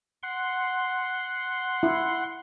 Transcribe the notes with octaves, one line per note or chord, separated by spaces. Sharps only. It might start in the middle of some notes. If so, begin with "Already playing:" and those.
F#5 C6
E4